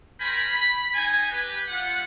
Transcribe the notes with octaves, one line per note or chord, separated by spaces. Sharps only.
A#4 C5 G5 G#5 B5
B5
D#4 G5 G#5
G4 B4
G3 F4 F#5